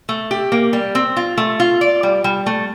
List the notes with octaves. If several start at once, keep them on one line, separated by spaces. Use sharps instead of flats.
A3
G4
A#3
G3
C4
F4
A3
F4
D5
G3
G3
A3